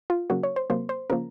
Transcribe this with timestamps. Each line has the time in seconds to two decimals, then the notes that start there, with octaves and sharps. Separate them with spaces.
0.10 F4
0.30 C#3 F#3 A#3 F#4
0.43 C#5
0.56 C5
0.70 C3 F#3 A#3 C5
0.89 C5
1.10 C#3 F3 A#3 A#4